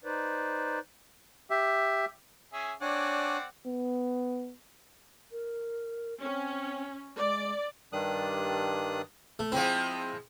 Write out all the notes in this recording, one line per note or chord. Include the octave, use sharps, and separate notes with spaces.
D#4 B4 C5 D5
G4 E5
C#4 G#4 E5
C4 D4 C#5 D5 F#5 G#5
B3
A#4
C4 C#4
G#3 D5
G2 D#3 G3 D4 D#6 F#6
A3
F3 G#3 C4 E4